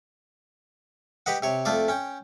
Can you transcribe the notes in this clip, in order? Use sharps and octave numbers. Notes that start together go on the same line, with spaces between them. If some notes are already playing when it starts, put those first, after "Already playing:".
G4 B4 D#5 F#5
C3 C#5
F2 A3 F4 D5 D6
C#4 G5